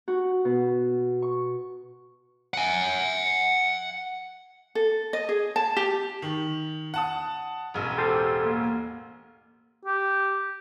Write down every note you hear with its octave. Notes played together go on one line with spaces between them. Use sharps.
F#4
B2
C#6
F#5 G#5
A4
D#5
G#4
A5
G4
D#3
F#5 A5 D#6
E1 A1
G4 A4 C5
A#3
G4